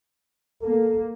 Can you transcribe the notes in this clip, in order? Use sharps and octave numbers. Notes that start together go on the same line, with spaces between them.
A#3 A4